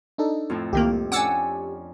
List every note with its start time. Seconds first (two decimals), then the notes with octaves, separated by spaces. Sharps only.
0.18 D4 D#4 A4
0.50 F2 A2
0.73 C2 D#3 A#3 G4
1.12 C#4 D4 F#5 G#5 D6 E6